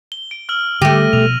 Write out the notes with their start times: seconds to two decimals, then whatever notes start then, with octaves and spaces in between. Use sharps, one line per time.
0.12 G7
0.31 D7
0.49 E6 F6 F#7
0.82 D3 A3 G4 A#6 D#7
1.13 B2 F3 F7